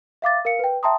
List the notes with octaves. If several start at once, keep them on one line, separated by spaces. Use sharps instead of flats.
E5 F5 D6 A6
A#4 F5 C#7
B4 G5
E5 G5 A5 A#5 C6 D#6